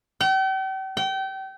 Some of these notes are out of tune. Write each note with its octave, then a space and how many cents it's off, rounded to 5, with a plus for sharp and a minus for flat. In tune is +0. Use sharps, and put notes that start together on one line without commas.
G5 -40
G5 -30